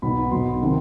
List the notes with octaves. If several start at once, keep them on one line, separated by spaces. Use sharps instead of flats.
B1 B2 B3 D#4 B5
B1 B2 B3 C6
C3 D#3